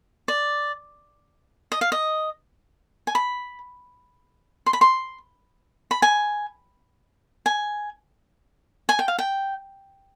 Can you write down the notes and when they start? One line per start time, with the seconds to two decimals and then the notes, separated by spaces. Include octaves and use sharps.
0.28 D5
1.72 D#5
1.81 F5
1.92 D#5
3.07 G#5
3.15 B5
4.66 C6
4.73 B5
4.81 C6
5.91 B5
6.02 G#5
7.46 G#5
8.89 G#5
8.99 G5
9.08 F5
9.19 G5